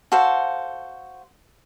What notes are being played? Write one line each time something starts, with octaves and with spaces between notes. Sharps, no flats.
F#4 A4 C5 F5